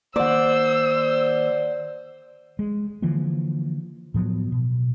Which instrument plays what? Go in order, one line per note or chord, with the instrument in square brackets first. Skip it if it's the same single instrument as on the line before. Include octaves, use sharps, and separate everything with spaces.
[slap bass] D#3 A#3 [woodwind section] C5 [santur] D5 F#5 [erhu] E6
[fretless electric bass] G#3
D3 E3 F3 A#3
A2 F3 F#3 B3
B2